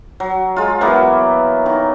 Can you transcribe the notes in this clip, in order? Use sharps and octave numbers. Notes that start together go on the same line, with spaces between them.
F#3
G#3 F4
E3 F#3 A#3 B3
D#3